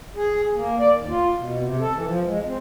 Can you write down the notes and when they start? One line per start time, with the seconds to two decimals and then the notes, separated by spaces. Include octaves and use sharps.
0.16 G#4
0.55 A#3
0.79 D5
0.94 D#2
1.09 F4
1.36 B2
1.59 C3
1.80 A4
1.95 E3
2.06 F3
2.25 G#3
2.45 C4